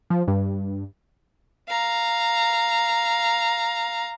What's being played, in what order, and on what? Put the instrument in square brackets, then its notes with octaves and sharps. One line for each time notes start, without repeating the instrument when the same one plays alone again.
[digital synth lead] F3
G2
[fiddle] F5 A#5